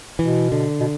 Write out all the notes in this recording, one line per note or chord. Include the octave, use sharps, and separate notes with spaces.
B2 E3
D3
B2